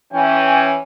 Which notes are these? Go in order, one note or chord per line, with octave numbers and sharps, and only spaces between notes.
E3 C#4 G5